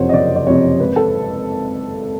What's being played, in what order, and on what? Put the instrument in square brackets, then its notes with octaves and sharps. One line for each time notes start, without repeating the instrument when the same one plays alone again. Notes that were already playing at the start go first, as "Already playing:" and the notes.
Already playing: [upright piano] F#1 F2 C3 F3 C5 C#5 F#5
D#5
F#1 D5
D5
F2 C3 F3 C#5
G#1 B4
A4